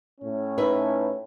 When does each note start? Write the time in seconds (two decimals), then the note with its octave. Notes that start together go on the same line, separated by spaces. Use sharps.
0.21 A2 C#4
0.58 D#4 B4 E5